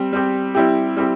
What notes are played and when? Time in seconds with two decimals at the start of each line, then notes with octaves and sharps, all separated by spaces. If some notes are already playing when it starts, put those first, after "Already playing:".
Already playing: G3 C4 G4
0.13 G3 C4 G4
0.55 G3 C4 E4 G4
0.96 G3 C4 E4 G4